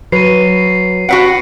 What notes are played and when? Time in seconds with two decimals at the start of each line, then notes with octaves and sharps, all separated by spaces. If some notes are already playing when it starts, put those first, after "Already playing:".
0.12 F#3 B4 C7 D#7
1.09 F#4 B4 F#5 C#7 D7